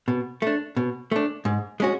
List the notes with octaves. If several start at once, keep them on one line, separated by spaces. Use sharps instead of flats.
B2
A3 D4
B2
A3 D4
G#2
G#3 C#4 F#4